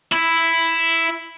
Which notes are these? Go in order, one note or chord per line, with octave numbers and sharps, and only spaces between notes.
E4